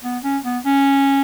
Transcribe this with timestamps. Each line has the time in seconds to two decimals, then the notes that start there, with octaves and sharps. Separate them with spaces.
0.04 B3
0.23 C#4
0.44 B3
0.65 C#4